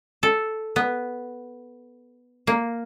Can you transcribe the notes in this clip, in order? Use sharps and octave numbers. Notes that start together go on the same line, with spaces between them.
A4
B3
A#3